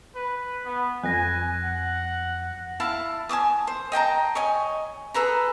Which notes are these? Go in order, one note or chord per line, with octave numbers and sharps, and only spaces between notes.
B4
B3
F2 G#5 F#6 A#6
F#5
E4 F5 A5
G#5 A5 D6 D#6
C5
D#5 G5 A5 A#5
C#5 D#5 G#5
G#4 A4 B4 A#5